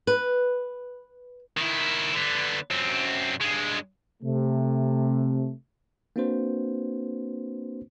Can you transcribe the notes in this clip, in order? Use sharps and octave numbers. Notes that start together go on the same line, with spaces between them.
B4
D#3 E4
D3 B3
F#2 C4
G2 G#3
C3 A3
A#3 C4 D4 F#4 B4 C5